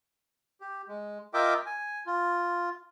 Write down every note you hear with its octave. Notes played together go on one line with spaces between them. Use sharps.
G4
G#3
F4 A#4 D#5 E5 G5 D6
G#5
F4